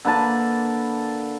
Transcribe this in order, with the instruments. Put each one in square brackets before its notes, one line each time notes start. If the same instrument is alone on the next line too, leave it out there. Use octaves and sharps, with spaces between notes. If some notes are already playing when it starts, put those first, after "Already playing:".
[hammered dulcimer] D3 A#3 B4 A5